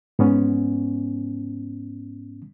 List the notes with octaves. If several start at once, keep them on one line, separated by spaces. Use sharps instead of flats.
G#2 B3 C#4